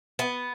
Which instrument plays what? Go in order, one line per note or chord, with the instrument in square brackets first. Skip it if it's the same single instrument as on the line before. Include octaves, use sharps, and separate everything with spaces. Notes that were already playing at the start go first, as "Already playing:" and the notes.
[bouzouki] B3